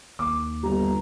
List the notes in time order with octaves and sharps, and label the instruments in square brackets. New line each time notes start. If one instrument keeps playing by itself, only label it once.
[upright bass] D#2 [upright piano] D6
[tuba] G1 [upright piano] G3 [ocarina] A#5